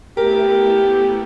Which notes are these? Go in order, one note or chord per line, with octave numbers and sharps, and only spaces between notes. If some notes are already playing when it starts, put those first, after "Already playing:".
A3 B3 E4 G4 A#4